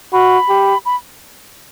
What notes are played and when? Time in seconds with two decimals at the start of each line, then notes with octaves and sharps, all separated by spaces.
0.13 F#4 B5
0.49 G4
0.85 B5